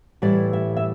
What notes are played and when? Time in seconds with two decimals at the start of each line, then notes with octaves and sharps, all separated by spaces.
0.22 A2 E3 G3 D5
0.53 E5
0.77 E5